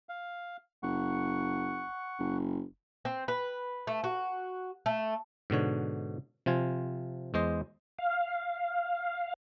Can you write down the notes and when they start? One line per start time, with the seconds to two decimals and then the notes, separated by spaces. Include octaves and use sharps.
0.09 F5
0.83 F#1 F#5 C#6
2.19 F#1
3.05 C4
3.28 B4
3.87 A3
4.04 F#4
4.86 A3
5.50 G#2 B2 D3 C#5
6.46 C3 F3 F4 G#5
7.34 E2 G#3 C5 D#5
7.99 F5